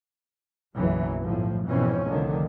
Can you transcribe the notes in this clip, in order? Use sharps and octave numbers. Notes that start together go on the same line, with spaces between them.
F#1 B1 B2 E3 F#3
G1 A2 F3
F2 G#2 B2 E3 C4 C#4
F1 C2 D3 D#3 F3